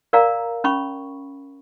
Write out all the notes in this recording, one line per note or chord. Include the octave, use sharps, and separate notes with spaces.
A#4 D5 F5 A#5
C#4 B5 C#6